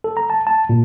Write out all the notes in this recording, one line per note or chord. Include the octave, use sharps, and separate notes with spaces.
A4
A#5
A5
A5
A#2